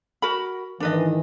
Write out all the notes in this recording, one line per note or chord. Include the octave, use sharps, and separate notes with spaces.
F#4 A#4 B5
G#2 D#3 E3 D4 B4 D#5